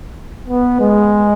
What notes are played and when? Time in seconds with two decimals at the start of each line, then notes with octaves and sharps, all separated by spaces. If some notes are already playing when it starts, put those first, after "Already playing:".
0.48 B3
0.80 G#3